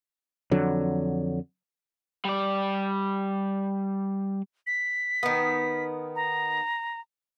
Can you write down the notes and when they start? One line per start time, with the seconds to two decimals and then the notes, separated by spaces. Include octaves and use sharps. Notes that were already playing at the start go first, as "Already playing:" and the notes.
0.51 F2 D3 F#3
2.25 G3 D5
4.67 B6
5.23 D#3 B3
6.16 A#5